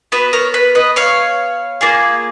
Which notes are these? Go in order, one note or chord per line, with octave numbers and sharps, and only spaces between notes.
B3 F#4 B4
A#4 C#5
B4
B4 D#5
C#5 F5
A#3 F4 G#4